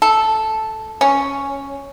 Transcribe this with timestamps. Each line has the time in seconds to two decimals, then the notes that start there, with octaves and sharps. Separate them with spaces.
0.02 A4
1.01 C#4